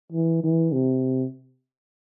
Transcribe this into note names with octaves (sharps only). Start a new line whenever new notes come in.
E3
E3
C3